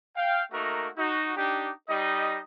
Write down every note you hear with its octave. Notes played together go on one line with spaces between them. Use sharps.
F5 G5
A3 A#3 D#4 F#4 A#4
D#4 F#4
D4 D#4 G4
G3 D#4 D#5